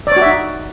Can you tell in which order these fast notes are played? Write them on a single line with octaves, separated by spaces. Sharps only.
D5 C#5 F#4 E5 D#4